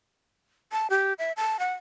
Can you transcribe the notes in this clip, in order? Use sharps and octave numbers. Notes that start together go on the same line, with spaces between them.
A5
G4
E5
A5
F#5